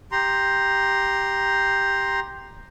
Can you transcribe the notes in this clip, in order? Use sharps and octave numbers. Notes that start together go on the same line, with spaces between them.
G4 A#5 C6